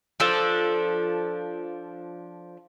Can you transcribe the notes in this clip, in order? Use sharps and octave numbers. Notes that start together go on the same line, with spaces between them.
F3 D4 A4